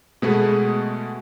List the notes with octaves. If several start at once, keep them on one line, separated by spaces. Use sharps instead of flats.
B2 G#3 A3 B3 G#4 B4